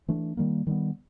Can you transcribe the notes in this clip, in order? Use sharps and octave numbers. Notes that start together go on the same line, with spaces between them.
E3 A3 D4
D#3 G3 A#3
D#3 G3 B3